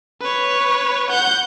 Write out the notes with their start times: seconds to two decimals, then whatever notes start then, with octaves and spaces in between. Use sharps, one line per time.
0.21 B4 C#5
1.10 F#5 G6